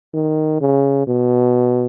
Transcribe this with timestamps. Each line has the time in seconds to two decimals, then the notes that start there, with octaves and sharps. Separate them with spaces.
0.14 D#3
0.61 C#3
1.07 B2